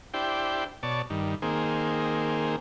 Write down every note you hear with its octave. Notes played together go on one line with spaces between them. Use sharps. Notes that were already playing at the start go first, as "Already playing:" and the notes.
D4 E4 G4 C5 G5
B2 C#5 D5 A5
G2 D#3
D#3 A#3 C4 G#4